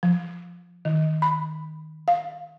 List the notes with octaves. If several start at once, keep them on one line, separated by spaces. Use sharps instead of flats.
F3
D#3
B5
F5